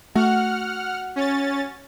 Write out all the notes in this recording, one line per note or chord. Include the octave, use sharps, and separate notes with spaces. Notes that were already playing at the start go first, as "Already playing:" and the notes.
A3 F#4 F#5 F6
C#4 A6